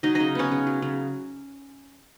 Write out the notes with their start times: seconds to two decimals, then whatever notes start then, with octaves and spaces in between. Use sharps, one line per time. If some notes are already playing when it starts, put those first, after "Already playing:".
0.03 F#3 D#4 D#5
0.15 C#3 D#4 D#5
0.35 B3 C#4 C#5
0.51 C#3
0.67 F#3
0.82 C#3